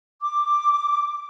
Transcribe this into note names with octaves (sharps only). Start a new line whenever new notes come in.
D6